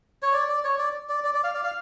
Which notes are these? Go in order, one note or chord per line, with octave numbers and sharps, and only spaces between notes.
C#5
D5
D5
C#5
D5
D5
D5
D5
F5
D5
F5